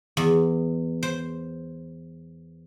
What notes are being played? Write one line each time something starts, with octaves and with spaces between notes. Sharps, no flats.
E2
C5